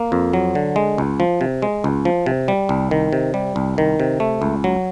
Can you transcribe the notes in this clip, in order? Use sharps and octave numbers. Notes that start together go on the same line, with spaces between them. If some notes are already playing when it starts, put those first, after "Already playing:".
Already playing: A#3
F2
F#3
D3
G#3
C#2
F3
C3
G#3
C#2
F3
C3
G3
C2
D#3
C3
G3
C2
D#3
C3
A3
C#2
F#3